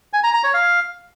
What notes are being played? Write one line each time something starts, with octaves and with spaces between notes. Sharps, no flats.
G#5
A#5
A#5
C#5
F5